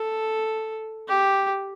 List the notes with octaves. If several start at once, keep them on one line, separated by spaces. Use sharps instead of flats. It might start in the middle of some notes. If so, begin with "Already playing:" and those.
Already playing: A4
G4